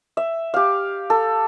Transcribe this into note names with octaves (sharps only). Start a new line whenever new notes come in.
E5
G4 F5
A4